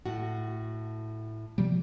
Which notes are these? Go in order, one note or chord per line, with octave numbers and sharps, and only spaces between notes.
A2 F#4
C3 F3 G3